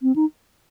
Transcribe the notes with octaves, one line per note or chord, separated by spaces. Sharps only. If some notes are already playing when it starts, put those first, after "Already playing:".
C4
D#4